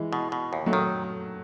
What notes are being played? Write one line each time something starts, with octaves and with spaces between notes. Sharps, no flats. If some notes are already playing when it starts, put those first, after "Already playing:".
Already playing: E3 G#3
B2
B2
D#2
F#3 A3
D#3